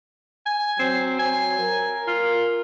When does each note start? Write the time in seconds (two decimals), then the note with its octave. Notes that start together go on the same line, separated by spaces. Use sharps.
0.46 G#5
0.79 F#3 C4
1.19 G#5
1.59 A#4
2.08 F4